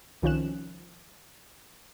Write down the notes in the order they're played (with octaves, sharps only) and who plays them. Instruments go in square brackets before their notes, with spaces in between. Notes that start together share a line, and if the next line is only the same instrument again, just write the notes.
[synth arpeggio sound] C2 D#3 F3 C#4 F#6 E7